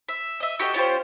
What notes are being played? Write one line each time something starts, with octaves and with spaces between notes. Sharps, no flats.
E5
D#5 E5
F#4 G4 A4 D#5
C#4 F4 G4 C5